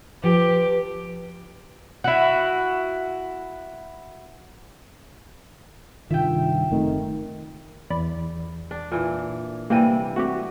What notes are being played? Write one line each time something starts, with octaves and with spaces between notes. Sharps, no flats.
F3 G4 B4
E4 F#4
G2 C3 D#3 F4 E5 G5
F#1 D#3 A3 C4
E2 D5 B5
D4
A#2 E3
C3 E3 G3 A#3 D#7
A3 C4 F#4 G4